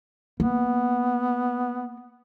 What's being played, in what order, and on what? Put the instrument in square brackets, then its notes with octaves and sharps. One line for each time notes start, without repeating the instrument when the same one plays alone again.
[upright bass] A#3 [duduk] B3